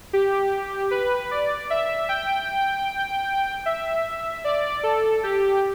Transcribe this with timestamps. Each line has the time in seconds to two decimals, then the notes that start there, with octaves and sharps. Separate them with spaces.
0.13 G4
0.91 B4
1.31 D5
1.70 E5
2.09 G5
3.66 E5
4.44 D5
4.83 A4
5.23 G4